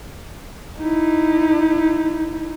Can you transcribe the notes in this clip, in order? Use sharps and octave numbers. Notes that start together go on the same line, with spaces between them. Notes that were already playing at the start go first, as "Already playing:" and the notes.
D#4 E4